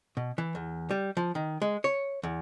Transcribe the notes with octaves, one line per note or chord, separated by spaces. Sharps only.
B2
E3
E2
G3
F3
D#3
G#3
C#5
E2